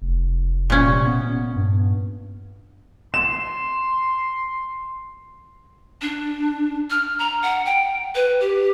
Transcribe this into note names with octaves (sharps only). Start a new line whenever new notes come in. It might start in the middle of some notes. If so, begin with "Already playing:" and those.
F1
A#2 C#4
C3
B3
G2
C6 E7
D4
F6
A#5
F#5
G5
B4
G4